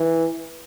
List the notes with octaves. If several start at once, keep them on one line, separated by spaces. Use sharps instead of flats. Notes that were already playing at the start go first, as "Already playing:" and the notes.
Already playing: E3